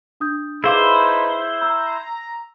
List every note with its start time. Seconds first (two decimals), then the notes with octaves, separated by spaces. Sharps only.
0.20 D4 D#6 G6
0.64 D#4 E4 G#4 B4 C5 F5 B5 D6
1.62 A#5 E6